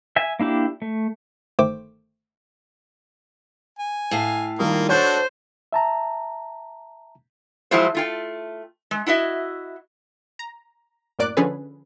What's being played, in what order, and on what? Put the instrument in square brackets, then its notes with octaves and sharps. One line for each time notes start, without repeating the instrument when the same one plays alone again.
[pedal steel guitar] E5 G#5
A#3 D4 E4 G4
A3
[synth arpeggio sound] G1 D#3 A3 C5 G5 D6
[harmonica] G#5
[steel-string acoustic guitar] A2 F5
[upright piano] D#3 G3 D#6 [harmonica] A#3 F4
[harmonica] D4 F#4 A4 [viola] C5 [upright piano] C#5 G6
[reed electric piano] E5 A5 A#5
[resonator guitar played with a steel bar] F3 F#3 G#3 E4 F4 C5
A3 F4 G5
G#3
E4 F#4 D#5 E5
[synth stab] A#5
F#2 A2 A#3 D5 D6 F#6
D3 F3 C#4 G#4 A4 B4